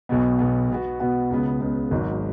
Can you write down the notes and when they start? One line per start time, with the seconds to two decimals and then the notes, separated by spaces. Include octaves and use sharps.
0.09 B1 B2 B3
0.39 B1 B2 B3
0.70 B2 B3 F#4
1.00 B2 B3 F#4
1.30 C#2 C#3 B3
1.61 C#2 C#3 B3
1.91 G#1 G#2 F#3